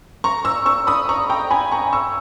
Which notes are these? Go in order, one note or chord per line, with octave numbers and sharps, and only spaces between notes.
A#5 C#6
C#6 E6
C#6 E6
B5 D#6
A#5 C#6
G5 A#5
G#5 B5
A#5 C#6
C#6 E6